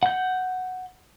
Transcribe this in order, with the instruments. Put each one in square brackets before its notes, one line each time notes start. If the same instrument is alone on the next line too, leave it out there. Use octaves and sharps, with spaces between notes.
[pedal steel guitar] F#5 G6